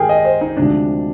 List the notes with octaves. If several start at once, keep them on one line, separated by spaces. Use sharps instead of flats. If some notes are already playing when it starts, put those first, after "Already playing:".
Already playing: G#2 D#3 G4 G#4 A#4 G5
D#5
C5
D#4
D2 C3 F3 G#3 D4